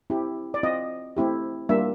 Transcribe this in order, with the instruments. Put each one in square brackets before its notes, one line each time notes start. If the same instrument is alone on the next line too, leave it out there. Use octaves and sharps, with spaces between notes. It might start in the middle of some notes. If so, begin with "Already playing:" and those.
[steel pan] C4 E4 G4
D5
C4 F4 D#5
A3 C4 E4 G4
G3 A#3 D4 F4 E5